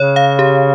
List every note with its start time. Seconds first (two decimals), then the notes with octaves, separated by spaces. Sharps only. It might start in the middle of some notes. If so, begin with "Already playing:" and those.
Already playing: C#3 C#5
0.16 F5
0.39 G4